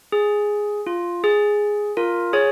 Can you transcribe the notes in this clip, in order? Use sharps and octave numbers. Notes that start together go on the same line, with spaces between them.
G#4
F4
G#4
F4 A#4
G#4 C#5